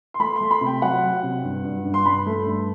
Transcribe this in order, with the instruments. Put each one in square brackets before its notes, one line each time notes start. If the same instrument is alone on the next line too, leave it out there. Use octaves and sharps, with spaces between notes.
[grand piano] C6
A3 B5
A3 C6
B5
C3
G5
F#3 F#5
F#3
C3
G2
G2
G2
C6
G2 B5
A3
G2